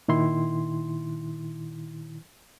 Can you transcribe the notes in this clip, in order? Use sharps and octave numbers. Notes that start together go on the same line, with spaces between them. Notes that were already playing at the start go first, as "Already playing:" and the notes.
A#2 D#3 E4 C6